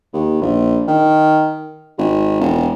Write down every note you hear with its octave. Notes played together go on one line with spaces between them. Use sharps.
D#2
A#1
D#3
G#1
E1